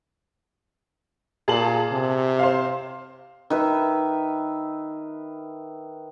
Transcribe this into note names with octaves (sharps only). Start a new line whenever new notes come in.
A#2 G#4 A5 F#7
C3
C5 F5
D#3 B4 E5